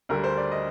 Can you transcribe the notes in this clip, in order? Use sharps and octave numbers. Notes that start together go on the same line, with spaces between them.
D2 D3 G3 A#4
C5
D5
D#5